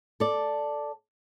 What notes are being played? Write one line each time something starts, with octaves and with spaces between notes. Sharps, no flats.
A4 D5